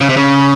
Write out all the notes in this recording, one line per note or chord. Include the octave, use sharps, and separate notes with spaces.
C#3
C3
C#3